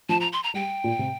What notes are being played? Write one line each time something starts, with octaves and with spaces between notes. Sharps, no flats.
F3 A5
A#5
C6
A#5
G3 G5
A#2
C3